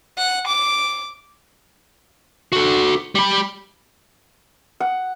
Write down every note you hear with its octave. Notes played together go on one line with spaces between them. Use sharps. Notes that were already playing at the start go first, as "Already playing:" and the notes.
F#5
D6
F#4 A4
G3 B5
F#5